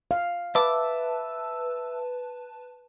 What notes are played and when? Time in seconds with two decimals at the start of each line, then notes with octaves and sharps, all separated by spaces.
0.11 F5
0.55 B4 E5 A5 D6